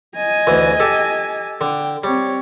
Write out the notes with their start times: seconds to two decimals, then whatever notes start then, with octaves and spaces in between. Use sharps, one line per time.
0.16 D#5 G#5
0.47 D2 E3
0.80 G4 A4
1.61 D3 G5
2.04 G3 C4 C#5